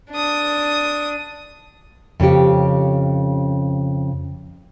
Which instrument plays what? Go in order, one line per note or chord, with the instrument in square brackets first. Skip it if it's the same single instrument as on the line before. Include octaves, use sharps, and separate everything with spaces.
[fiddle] D4 D#6
[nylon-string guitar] F2 C#3 C#4 G4